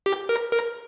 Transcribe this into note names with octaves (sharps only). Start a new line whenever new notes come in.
G4
A#4
A#4